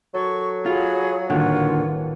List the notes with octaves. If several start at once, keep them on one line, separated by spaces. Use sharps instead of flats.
F#3 A4 C#6
F4 F#4 G#4 B5
D#1 A1 A#2 D3 D#3 F4 F#4 C#5